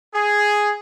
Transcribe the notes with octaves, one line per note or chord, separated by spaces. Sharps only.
G#4